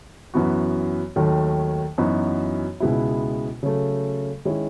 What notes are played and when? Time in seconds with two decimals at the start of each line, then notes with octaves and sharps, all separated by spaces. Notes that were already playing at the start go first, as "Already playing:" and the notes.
0.34 F#2 E3 B3 F#4
1.16 D#2 D#3 F#3 A3
1.98 F#2 E3 B3 D#4 F#4
2.80 C#2 B2 G#3 B3 E4
3.63 C#3 F#3 A3
4.45 D#3 G#3 C#4 E4